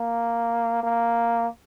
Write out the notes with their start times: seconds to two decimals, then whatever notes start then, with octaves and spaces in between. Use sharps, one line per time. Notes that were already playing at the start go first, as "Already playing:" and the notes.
Already playing: A#3
0.83 A#3